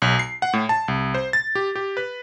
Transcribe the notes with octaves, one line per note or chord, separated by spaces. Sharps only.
B1
C7
F#5
A2
A5
C2
C5
A6
G4
G4
B4